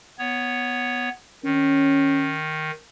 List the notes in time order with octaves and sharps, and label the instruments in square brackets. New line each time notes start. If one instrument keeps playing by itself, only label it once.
[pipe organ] B3 C#5
[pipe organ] D#3 [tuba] C#4